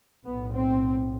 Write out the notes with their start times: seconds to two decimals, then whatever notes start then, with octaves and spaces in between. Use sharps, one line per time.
0.25 B1 A2 B3
0.53 C4